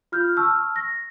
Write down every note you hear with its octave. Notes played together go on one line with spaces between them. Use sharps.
F4 F6 G6
A5 C#6 E6 F6
A#6